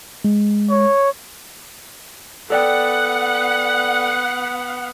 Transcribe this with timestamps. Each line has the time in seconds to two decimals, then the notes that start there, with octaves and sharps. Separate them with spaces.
0.25 G#3
0.70 C#5
2.50 B3 A4 D5 F#5 G5